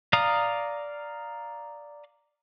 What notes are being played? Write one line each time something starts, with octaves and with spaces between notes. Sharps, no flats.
D5 F5 A#5 D#6